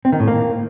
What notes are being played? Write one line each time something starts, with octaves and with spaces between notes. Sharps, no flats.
C4
D#3
A2
A#3